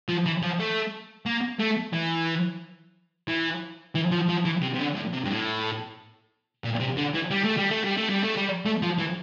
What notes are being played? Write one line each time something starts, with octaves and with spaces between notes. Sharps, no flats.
F3
E3
F3
A3
A#3
A3
E3
E3
E3
F3
F3
E3
C3
C3
D3
A2
C3
G2
A2
A#2
C3
D3
E3
G3
A3
G3
A3
G3
A3
G3
A3
G3
A3
F3
E3